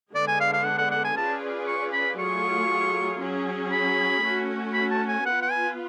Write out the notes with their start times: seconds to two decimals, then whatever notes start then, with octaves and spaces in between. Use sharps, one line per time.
0.15 D3 G#3 B3 D4 D5
0.28 G#5
0.40 F5
0.53 F5
0.65 F#5
0.78 F#5
0.91 F#5
1.04 G#5
1.16 C#4 F4 G#4 B4 D5 A5
1.67 C#6
1.93 B5
2.19 F#3 A3 F4 G#4 C#6
3.21 F#3 C#4 G#4
3.71 B5
4.23 A3 C#4 F#4
4.74 B5
4.91 A5
5.08 G#5
5.25 B3 F4 B4 F#5
5.42 F#5
5.51 G#5